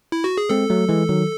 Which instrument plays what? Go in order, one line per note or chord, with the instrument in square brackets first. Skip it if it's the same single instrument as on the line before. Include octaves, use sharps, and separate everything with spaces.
[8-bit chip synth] E4
F#4
G#4
[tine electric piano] G#3 C4 [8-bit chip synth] A4
[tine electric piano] F#3 A3
E3 G#3
D#3 F#3